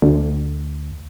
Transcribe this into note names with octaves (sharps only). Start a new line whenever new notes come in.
D2